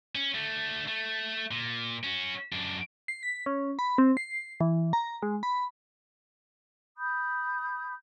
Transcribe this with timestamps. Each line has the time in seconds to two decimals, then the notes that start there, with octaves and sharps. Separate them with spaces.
0.15 C#4
0.34 D3 A3
0.88 A3
1.51 A#2
2.04 C#4 F#4
2.52 F#2 D4
3.08 C7
3.23 B6
3.46 C#4
3.79 B5
3.98 C4
4.17 C7
4.61 E3
4.93 A#5
5.22 G#3
5.43 B5
6.97 B5 D#6 G6